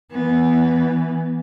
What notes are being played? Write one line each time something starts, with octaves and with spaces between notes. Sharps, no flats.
E3 B3